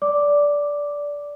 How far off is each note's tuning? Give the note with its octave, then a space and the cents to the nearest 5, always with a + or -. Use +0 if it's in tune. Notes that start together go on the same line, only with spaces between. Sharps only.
D5 -15 D6 +0